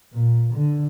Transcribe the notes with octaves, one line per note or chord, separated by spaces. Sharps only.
A#2
D3